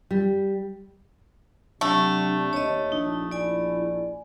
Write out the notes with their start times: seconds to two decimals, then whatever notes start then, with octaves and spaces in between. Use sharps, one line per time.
0.11 G3
1.81 C3 F#3 A3 D4
2.53 D#2 C#5 D#5
2.92 A#1 D4 D#4
3.31 E4 D5 G#5